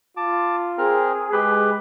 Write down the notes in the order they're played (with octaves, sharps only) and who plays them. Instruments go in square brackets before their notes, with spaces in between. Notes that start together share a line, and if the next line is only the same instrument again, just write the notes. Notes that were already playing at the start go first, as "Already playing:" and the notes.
[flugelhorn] F4 [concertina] A5 D6
[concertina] C4 A#4 [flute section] G#4
[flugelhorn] G#3 [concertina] G4 B4